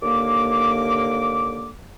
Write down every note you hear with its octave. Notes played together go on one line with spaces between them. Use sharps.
D#2 D3 A#3 D6